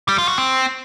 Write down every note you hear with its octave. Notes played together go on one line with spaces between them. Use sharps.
G3
F4
F#4
C4